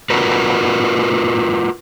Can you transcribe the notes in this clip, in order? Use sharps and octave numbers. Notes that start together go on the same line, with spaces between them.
F4 F#4 A#4 B4